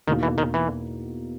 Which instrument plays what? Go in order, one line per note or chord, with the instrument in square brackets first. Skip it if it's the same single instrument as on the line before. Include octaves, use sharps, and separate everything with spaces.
[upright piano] E2 B2 A#3 D#4 [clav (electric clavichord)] D#3
[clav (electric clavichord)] E3
D#3
E3